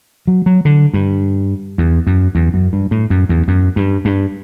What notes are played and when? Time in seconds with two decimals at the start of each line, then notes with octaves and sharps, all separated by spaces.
0.27 F#3
0.46 F#3
0.65 D3
0.94 G2
1.78 E2
2.07 F#2
2.35 E2
2.54 F#2
2.73 G2
2.91 A2
3.10 F#2
3.29 E2
3.48 F#2
3.76 G2
4.05 G2